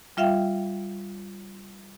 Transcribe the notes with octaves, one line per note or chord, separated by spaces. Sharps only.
G3 F4 E5 F5 G5